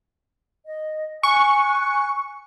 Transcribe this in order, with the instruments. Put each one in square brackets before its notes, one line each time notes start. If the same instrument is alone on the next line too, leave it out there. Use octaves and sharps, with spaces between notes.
[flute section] D#5
[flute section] G#5 F#6 [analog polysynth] C#6